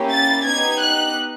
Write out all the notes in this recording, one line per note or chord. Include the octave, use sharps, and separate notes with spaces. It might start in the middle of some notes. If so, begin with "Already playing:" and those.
Already playing: A#3 C#4 E4 G4
A6
B3 D#4 G4 G#6
F#6